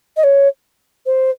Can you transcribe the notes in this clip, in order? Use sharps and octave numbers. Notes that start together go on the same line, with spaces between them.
D#5
C#5
C5